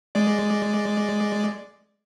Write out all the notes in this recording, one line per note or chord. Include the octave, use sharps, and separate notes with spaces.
G#3 D5